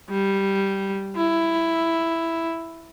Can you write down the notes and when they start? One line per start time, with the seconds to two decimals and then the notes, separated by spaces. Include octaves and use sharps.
0.10 G3
1.17 E4